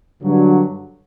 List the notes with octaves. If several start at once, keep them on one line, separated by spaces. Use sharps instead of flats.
G2 D3 F#3